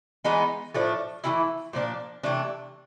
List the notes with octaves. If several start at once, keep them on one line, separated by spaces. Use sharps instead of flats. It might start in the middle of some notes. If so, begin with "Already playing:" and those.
E3 G#3 B3 D#4
A2 F3 A3 D4
E3 A3 C#4 E4
A#2 F3 A#3 D4
C3 E3 A3 D4